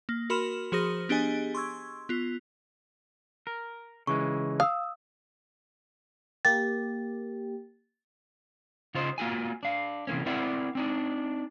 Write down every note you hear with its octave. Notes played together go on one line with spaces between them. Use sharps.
A#3
F#4 A#4 B5 C6 F6 E7
F3 F#4 G#4 C5 D#6 A#6
B3 D4 G4 G#4 D#5 G#5
C6 C#6 E6 G#6
B3 F4
A#4
C#3 E3 G#3 C#6
F5 D#6 E6
A#3 G4 A6
C#3 F4 C5 D#5
A#3 F4 F#4 G#5
D4 F5
C3 E3 A#3 C#4
C4 E4 A#4 D5 E5 F#5
C4 D4 D#4